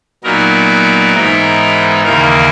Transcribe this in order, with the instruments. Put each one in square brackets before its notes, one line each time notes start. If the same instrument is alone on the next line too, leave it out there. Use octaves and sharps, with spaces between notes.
[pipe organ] A#2 F#3 B3 D#4 A#4
G#2 E3 B3 D#4
D#2 C#3 E3 A#3 D#4 A#4